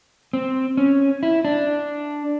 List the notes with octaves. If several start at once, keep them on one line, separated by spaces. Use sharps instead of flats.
C4
C#4
E4
D4